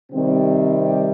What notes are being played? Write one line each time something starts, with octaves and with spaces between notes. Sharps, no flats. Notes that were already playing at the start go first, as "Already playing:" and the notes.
C3 D#3 G3 C4